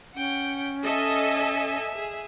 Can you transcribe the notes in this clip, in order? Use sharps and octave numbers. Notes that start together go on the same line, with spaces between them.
C#4 F#5 G5
A4 D#5 E5 G#5
G#4 E5